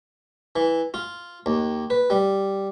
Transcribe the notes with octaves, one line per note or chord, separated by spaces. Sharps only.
E3
F4
D#2
B4
G3